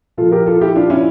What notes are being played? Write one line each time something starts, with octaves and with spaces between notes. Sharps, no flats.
A#2 F3 F4 A4
G4 A#4
F4 A4
E4 G4
D4 F4
C#4 E4